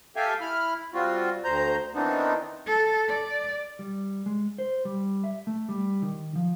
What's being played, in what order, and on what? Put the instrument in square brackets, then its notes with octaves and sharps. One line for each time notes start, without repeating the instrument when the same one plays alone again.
[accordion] G4 A4 E5 F5 G5 G#5
E4 B5 F6
G3 C4 F4 F#4
D2 C5 A#5 G6
D#3 E3 B3 C4 D4 D#4
[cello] A4
D5
[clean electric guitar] G3
G#3
C5
G3
E5
A3
G3
D#3
F3